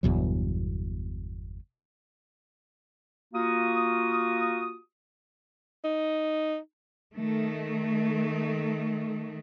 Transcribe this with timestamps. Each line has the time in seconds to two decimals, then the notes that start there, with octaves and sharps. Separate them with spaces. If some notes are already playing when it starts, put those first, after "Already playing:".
0.03 G1 E2 B2 F#3
3.34 A#3 F4 F#4 D#6
5.85 D#4
7.15 D#3 A3